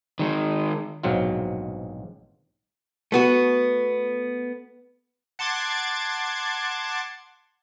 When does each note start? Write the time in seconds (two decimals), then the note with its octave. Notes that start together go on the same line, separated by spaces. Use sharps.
0.19 D#3 G#3
1.03 A#1 G#2 B2 F#3 C4 F4
3.12 A3 B3 F#4
5.39 F#5 A5 C6 D6 G#6 A6